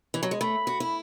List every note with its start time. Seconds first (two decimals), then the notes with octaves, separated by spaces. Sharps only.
0.14 E3
0.23 F#3
0.31 G#3
0.40 A3 B5
0.67 F#4
0.80 E4